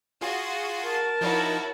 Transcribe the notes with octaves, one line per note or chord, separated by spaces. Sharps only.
F4 F#4 G#4 C6
A#4 A5
F3 D#4 E4 F#4 C#5